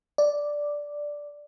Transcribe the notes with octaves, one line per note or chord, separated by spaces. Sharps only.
D5